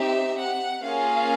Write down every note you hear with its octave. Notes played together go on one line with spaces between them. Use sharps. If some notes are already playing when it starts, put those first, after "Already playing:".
Already playing: C4 D#4 G4 E5
F#5
A#3 C#4 F4 G#4 F5